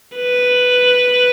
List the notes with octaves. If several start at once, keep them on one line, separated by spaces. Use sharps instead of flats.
B4